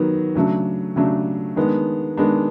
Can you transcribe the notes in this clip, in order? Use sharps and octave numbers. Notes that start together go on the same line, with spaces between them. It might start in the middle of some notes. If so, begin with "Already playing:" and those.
Already playing: D#3 F#3 B3
C#3 F#3 A3 D4
C#3 F#3 A3 D4
D#3 G#3 B3 D4
D#3 G#3 B3 D4